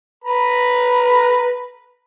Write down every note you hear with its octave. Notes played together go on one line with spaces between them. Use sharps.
B4 A#5 B5